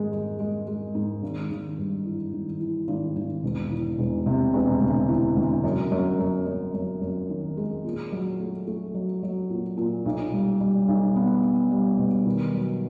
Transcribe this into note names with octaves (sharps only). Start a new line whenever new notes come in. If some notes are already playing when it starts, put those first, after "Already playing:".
Already playing: G#2 D#3 G#3
G#3
G#3
G#3
G#2
G#1
G#1
G2
E3
G#1
E3
G#1
G#1
E1
E3
E1
C3
E1
D2
E3
D2
F#2
F#2
F#2
F#2
F#2
F#2
D#3
G#3
A#2
F#3
A3
A3
F#3
F#3
A#2
A#2
B1
G3
G3
B1
B3
B3
G3
B2
D#3
F#3